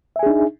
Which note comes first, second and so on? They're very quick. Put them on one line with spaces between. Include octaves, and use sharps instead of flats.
E5 G#5 G#4 D4 D#4